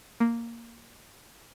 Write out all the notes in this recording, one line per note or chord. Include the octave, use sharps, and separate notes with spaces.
A#3